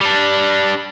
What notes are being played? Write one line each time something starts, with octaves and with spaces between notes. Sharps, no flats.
G3 D4